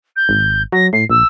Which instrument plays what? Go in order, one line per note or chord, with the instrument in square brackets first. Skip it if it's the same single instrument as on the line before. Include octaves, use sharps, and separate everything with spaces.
[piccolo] G6
[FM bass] G#1
[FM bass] F#3 [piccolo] A#6
[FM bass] A2 [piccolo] C7
[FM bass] A#1 [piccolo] E6